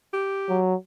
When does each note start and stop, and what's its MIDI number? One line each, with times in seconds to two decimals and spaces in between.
0.13 0.58 67
0.49 0.75 54